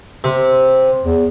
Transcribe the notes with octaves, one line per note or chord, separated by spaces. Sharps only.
C3
E2